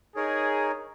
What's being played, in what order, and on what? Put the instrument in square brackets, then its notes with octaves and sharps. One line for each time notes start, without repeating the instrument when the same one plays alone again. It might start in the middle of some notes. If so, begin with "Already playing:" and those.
[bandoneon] D#4 A#4 C#5 [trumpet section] G#4